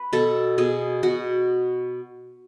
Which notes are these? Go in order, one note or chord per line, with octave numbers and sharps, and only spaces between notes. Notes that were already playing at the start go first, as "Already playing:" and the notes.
Already playing: B4
B2 A4
B2 G#4
B2 F#4